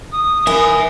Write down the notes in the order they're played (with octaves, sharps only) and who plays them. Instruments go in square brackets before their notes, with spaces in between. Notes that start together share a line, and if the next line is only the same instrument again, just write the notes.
[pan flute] D#6
[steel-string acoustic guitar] A#4 [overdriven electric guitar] E5 G#5